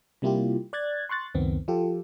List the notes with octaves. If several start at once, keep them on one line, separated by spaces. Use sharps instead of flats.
C3 G3 A#3 E4 F4 G4
D5 F#6 G#6 A6
C6 C#6 F#6 A6
C#2 F#2 D#3 B3 C4
F3 F4 G4 A4